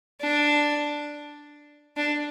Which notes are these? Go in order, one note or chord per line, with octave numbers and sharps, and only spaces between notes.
D4
D4